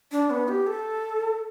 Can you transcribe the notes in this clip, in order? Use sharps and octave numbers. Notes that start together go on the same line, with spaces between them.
D4
B3
G4
A4